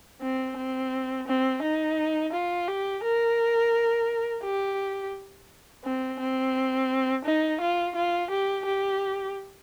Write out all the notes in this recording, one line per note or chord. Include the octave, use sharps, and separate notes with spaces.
C4
C4
C4
D#4
F4
G4
A#4
G4
C4
C4
D#4
F4
F4
G4
G4